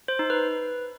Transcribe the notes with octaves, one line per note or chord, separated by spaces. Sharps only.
C5
D#4
B4